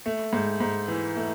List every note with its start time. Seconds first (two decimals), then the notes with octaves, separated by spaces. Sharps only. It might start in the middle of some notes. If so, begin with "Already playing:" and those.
0.06 A3
0.33 G#2
0.60 G#2
0.88 E3
1.16 A3